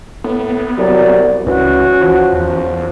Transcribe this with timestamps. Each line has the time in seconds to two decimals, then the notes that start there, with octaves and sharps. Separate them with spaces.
0.24 A2 B3
0.78 C2 F#3 D5
1.47 C#2 E3 C#4 F#4
2.01 E3 F3
2.33 E2